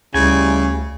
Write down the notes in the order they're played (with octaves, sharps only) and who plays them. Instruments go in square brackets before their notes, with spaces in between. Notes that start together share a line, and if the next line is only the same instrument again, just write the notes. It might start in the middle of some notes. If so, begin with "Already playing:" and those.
[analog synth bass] D2 [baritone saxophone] C#3 [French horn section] G3 E4 [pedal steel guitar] G#5